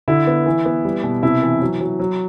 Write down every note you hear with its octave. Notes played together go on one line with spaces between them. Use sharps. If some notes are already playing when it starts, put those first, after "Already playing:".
D3 E4
B3
E3
B3
G3
B2
C3 E4
E3
F#3
F#3
F#3